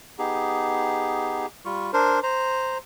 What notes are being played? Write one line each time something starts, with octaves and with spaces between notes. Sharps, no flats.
B3 D#4 G4 G#4
G3 F4 C#6
D4 A#4 C5
C5 A#5